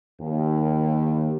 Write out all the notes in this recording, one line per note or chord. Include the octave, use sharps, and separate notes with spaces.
D#2